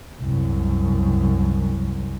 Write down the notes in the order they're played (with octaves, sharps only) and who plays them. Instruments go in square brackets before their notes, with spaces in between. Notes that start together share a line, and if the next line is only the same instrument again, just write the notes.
[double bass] C2 F#2